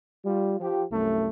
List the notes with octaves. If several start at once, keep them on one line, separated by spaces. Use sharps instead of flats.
G3 F4
F3 G4
C2 F#2 A3